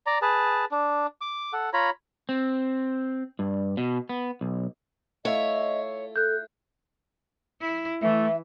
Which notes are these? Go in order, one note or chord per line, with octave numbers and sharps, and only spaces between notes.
D5 A#5
G#4 B4 A5
D4
D6
A4 F#5
F4 C#5 A#5 B5
C4
G2
B2
B3
B1
A3 E4 F4 C#5 D#5
A4 F#6 G6
E4
E3 A3 E5